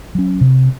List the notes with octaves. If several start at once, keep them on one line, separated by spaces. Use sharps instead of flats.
F#3 C#4
C3